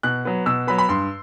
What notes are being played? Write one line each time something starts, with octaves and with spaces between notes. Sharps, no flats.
B2 F#6
F#3 B3
B2 E6
F#3 B3 B5
B5
G2 C6